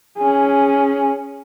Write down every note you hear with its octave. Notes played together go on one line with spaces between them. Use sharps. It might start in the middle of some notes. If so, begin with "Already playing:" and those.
C#4 G#4